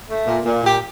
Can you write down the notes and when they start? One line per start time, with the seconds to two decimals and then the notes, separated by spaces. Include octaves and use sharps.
0.09 A3
0.27 A#2
0.45 A#2
0.64 A#2 G4